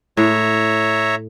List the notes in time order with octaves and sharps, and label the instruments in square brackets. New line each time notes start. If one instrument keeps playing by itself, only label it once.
[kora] A2 [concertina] C#5 E5 A#5